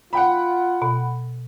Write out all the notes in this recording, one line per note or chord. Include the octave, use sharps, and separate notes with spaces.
F4 F#5 G5 B5
B2